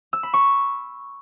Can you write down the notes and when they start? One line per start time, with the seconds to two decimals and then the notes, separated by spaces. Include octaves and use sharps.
0.13 E6
0.23 B5
0.33 C#6